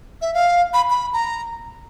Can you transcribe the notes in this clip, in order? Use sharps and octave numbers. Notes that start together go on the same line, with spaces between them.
E5
F5
B5
B5
A#5